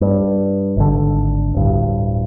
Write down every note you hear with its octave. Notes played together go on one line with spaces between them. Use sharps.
G2
G#1 D3
D1 G2